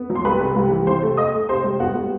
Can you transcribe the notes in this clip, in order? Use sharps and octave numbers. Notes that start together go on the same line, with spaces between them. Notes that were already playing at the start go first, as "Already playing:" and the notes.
Already playing: B3
F#3
C6
C2 B4 B5
C3
C2
E3
C3 C5 C6
A3
A3 D#5 D#6
A3
C3 C5 C6
G3
B3 F#4 F#5
G3